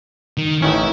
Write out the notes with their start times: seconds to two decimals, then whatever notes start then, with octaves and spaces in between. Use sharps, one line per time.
0.38 D#3
0.62 A1 D#3 C#4 E4